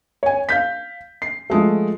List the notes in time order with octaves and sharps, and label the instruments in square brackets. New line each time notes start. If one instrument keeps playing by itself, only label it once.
[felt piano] C#5 G#5
F5 G6 B6
C7
F3 G#3 A3